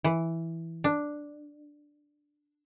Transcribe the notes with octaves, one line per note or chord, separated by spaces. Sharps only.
E3
D4